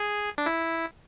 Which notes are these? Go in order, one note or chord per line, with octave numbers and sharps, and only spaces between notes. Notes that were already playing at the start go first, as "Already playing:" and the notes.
Already playing: G#4
D4
E4